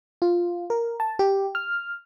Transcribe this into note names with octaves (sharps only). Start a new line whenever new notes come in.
F4
A#4
A5
G4
F6